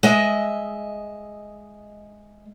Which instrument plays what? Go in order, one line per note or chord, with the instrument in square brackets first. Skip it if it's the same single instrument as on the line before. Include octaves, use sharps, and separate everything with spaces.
[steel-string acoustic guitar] G#3 D#5 E5